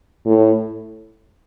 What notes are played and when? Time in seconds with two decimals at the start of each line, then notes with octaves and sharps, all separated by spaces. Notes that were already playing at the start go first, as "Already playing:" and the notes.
0.26 A2